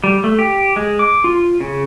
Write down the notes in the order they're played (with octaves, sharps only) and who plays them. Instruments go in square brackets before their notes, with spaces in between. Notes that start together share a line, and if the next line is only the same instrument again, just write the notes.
[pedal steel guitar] G3
A3
G4
G#3
D6
F4
C#3